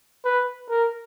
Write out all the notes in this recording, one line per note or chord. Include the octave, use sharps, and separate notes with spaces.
B4
A#4